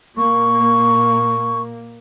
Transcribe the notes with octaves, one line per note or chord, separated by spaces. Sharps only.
A#2 A#3 C#6